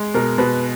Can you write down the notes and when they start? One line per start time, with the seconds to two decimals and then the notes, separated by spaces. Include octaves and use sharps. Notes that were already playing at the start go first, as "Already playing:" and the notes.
Already playing: G#3
0.14 B2 A#4
0.38 B2 B4